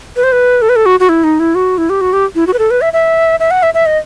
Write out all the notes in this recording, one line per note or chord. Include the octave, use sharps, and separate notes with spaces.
B4
C5
B4
A4
B4
A4
F#4
F#4
E4
D#4
E4
F#4
E4
G4
F#4
G4
E4
F#4
B4
A4
B4
E5
E5
E5
F#5
E5
E5
D#5